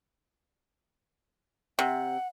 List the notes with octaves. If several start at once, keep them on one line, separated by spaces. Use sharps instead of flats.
C3 F#5